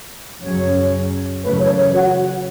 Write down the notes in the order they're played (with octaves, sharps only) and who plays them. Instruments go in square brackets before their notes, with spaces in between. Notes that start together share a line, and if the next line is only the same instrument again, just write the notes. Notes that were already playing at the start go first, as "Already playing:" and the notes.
[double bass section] F#2 C#3 F#3 C#4 [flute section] C#5
[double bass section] F#2 C#3 E3 A3 C#4 [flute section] B4
[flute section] C#5
C#5
F#4